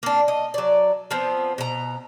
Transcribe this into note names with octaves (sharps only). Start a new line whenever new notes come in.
A#3 D4
D#5
F#3 D5
F3 B3 C4
B2 A#5